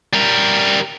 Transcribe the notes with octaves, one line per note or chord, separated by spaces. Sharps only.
G3 A#4